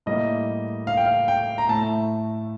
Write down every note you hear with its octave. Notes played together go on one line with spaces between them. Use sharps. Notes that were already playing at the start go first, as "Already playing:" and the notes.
A2 G3 A#3 D#5
F5
G5
F5
G5
A#5
A2 A3 A5